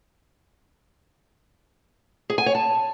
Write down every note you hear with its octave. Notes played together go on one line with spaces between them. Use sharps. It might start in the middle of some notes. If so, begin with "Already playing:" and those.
G#4
G#5
C#5
A5